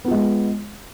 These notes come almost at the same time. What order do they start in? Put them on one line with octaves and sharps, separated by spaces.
B3 F4 G#3